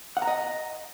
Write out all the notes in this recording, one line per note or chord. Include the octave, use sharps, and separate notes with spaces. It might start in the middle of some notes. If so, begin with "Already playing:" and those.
F#5
A#5
D#5